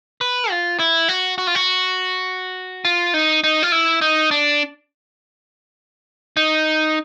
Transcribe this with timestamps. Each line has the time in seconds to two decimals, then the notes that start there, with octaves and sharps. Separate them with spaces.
0.21 B4
0.51 F4
0.79 E4
1.09 F#4
1.38 F#4
1.47 F4
1.55 F#4
2.85 F4
3.14 D#4
3.44 D#4
3.63 F4
3.72 E4
4.01 D#4
4.31 D4
6.37 D#4